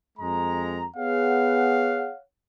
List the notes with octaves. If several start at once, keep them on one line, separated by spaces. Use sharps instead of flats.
F2 G#3 A#5
B3 G#4 C#5 F5 F#5